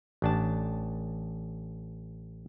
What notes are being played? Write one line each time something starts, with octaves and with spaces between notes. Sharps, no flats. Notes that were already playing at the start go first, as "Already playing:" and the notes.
A1 D4 A5